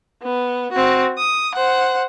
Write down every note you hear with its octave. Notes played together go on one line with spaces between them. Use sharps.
B3
C4 F#4
D#6
C5 F#5